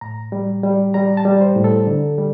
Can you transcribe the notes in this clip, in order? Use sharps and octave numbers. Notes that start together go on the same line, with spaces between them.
A2 A#5
G3
G3
G3 A#5
A5
G3
C5
A2
A4
D3
G3